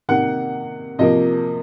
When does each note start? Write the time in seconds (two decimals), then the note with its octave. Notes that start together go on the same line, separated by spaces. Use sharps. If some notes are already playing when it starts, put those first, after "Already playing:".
0.09 C3 D#3 A#3 F#5
0.99 C3 F3 A#3 D#5